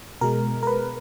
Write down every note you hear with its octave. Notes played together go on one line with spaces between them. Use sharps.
B2 G#3 A#4
A#4
B4